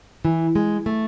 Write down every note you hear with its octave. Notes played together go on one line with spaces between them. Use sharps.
E3
G#3
A3